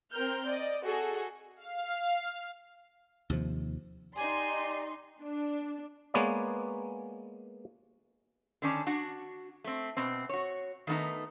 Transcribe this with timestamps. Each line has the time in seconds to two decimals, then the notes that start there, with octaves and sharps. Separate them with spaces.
0.12 C4 A#4 F6 G6
0.47 D5 D#5
0.83 F#4 G#4 A4
1.56 F5
3.30 D#2 C3 F3
4.16 D#4 G4 D5 G#5 C6
5.21 D4
6.14 G#3 A#3 B3 B4 C#5 D5
8.62 D3 D#3 C#4 D4
8.87 D4 F#4 F#5
9.64 A3 C4
9.97 B2 C4
10.29 F#4 C#5
10.87 D#3 A3 B3 D#4